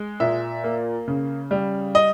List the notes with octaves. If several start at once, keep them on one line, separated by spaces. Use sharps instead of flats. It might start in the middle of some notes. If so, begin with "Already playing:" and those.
Already playing: G#3
A#2 E5
A#3
C#3
G3
D#5